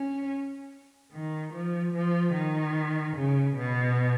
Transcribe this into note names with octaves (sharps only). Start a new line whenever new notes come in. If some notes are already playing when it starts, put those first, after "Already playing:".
Already playing: C#4
D#3
F3
F3
D#3
C#3
B2